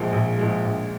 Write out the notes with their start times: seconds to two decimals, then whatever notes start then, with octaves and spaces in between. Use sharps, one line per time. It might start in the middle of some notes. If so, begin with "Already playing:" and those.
Already playing: A#1 A#2 F3 G#3
0.13 A#1
0.38 A#2 F3 G#3
0.65 A#1